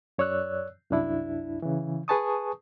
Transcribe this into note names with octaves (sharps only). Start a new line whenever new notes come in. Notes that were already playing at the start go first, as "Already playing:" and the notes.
F#2 C#5 D5 E6 F#6
C2 F#2 D4 E4
C#3 E3
G#4 B4 G#5 A5 C#6 D#6